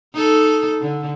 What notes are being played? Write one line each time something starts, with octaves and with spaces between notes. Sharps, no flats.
D#4 A4
D3